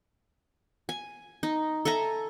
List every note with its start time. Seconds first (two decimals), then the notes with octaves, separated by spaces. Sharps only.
0.89 G#5
1.43 D#4
1.85 A4 E5 G#5 A#5